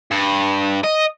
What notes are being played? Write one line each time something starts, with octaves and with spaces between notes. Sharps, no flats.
G2
D#5